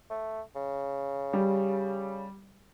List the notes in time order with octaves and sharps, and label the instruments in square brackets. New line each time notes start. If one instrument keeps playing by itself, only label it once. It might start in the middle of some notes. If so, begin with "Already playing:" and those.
[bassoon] A3
C#3
[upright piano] G3